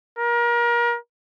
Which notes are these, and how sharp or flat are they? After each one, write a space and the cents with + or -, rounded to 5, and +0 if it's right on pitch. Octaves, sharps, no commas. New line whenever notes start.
A#4 +30